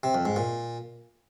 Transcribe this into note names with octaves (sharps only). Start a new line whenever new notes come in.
C3
F2
G#2
A#2